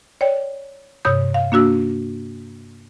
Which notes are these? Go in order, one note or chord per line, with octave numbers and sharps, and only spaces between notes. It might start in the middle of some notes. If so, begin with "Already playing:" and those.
C#5 D5 G5
G2 C3 C#5 D#6 G6
F5
A#3 D4 F#4 E6